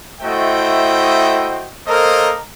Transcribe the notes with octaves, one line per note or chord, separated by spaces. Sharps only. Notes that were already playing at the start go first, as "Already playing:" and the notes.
A3 E4 F#4 C5 D#5 G5
A#3 A4 A#4 C5 C#5 D#5